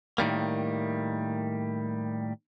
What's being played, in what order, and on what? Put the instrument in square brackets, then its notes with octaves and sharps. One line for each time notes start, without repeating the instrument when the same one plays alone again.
[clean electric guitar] A2 D#3 G3 A#3